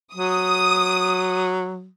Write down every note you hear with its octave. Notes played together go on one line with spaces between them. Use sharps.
F#3 D#6